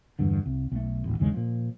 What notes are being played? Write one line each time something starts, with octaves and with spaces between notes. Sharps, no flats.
E2 G2 D3
C2
B1 A3
D#1 A1
G1 D#2 C#3 G#3
A#2 F3